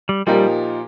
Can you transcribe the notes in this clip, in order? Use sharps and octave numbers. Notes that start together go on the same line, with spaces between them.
G3
A#2 F3 G3 D#4 G4 A#4